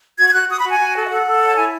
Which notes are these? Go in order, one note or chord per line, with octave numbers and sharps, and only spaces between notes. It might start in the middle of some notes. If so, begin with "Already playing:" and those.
F#4 G#6
G#6
F#4 F#6
F#4 D#6
B5
F#4
G#5
F#4
A4
E5
A4 F#5
A4
C#5
A5
E4 G#5